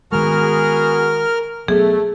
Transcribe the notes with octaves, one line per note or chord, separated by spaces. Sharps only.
D#3 G#3 B3 F#4 G#4 A#4 F6
F#3 A3 B3 G#4